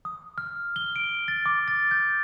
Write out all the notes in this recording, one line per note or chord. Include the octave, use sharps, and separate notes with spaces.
D#6
F6
G7
D7
A6
D6
A6
G6